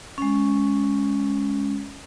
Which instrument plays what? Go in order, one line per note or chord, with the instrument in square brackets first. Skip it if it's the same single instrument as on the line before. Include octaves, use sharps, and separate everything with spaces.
[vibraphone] G#3 C#4